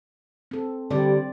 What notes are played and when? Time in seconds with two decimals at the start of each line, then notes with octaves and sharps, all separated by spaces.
0.51 C4 A4
0.91 D3 G3 C4 D5